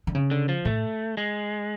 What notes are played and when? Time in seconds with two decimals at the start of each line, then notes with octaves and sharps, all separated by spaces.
0.07 D3
0.15 C#3
0.31 D3
0.49 F3
0.65 A2 A3
1.17 G#3